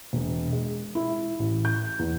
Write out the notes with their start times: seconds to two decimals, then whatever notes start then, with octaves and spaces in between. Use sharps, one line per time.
0.13 E1
0.52 G#3
0.95 E4
1.39 A1
1.65 G6
1.99 E2